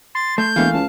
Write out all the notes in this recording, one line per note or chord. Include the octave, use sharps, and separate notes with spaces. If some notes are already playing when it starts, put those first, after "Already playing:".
C6 A6
A3 G6
E1 E3 A3 A#3 F5
C#2 A5